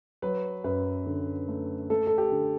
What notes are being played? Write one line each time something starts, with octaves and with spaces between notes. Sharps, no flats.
F#3 B4
F#2 B4
D3
A3
A3 A4
A4
G4
D3